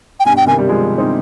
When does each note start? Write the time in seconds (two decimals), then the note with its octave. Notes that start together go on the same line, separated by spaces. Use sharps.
0.20 G5
0.25 G2 B2 G#5
0.37 G5
0.47 C3 D#3 G#5
0.58 D#3 G3
0.69 F3 G#3
0.98 C4 D#4